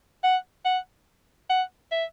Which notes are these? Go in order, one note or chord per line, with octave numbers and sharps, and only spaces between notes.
F#5
F#5
F#5
E5